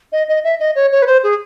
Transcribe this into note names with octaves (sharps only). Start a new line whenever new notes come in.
D#5
D#5
E5
D#5
C#5
C#5
B4
C5
G#4